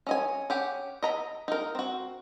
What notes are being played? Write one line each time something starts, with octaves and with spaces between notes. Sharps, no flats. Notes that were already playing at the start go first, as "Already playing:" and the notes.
C#4 D#5 G#5
C#4 G4 F#5
D#5 A#5 B5
D#4 A#4
C4 F#4